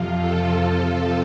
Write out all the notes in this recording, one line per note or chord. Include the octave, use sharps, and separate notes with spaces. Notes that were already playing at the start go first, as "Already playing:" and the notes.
Already playing: F2 C3 F3 F4
A4